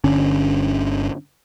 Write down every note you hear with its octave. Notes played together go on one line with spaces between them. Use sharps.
G1 D3 C#4